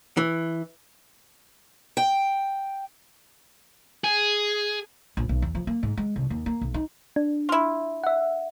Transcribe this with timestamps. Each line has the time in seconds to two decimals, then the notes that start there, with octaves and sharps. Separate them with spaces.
0.17 E3
1.97 G5
4.04 G#4
5.17 A#1
5.29 B1
5.42 E2
5.55 F3
5.67 A#3
5.83 G#2
5.97 G#3
6.16 C2
6.30 D#2
6.46 A#3
6.61 B1
6.74 D#4
7.16 D4
7.49 E4 F4
8.04 E5 F#5